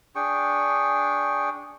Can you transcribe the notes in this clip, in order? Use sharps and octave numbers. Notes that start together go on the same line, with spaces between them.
D4 G#4 G5 C#6